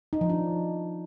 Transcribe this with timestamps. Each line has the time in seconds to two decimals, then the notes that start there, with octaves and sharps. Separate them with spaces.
0.13 D#4
0.21 F3
0.30 D4